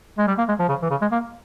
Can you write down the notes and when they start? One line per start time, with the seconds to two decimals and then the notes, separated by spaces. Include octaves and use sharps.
0.18 G#3
0.28 G3
0.38 A#3
0.49 G#3
0.59 F3
0.69 C#3
0.82 E3
0.91 C#3
1.02 G#3
1.12 A#3